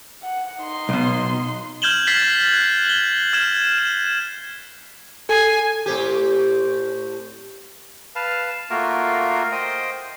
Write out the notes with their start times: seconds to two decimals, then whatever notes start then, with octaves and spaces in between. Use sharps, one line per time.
0.23 F#5
0.60 D#4 C6
0.89 B1 B2
1.82 F6 G6 G#6 E7 F#7 G7
2.07 F6 A6 B6 C7 F#7
2.52 F#6 G#6
2.85 F#7 G7
3.33 F6 G#6 E7
3.79 E7
5.29 A4 G#5 C7
5.86 A2 C4 G4
8.16 B4 F5 A5
8.70 A3 A#3 F4 F#4 A#4
9.52 C5 D#5 G5 D#6